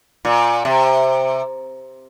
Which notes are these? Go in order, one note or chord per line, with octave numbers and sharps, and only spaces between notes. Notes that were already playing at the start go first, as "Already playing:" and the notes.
A#2
C3